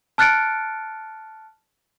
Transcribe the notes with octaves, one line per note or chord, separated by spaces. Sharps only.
A5 F6 F#6 A6 C#7 D7